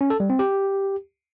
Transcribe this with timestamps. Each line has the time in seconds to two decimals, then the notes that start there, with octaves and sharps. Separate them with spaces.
0.01 C#4
0.10 A4
0.20 G3
0.30 C4
0.39 G4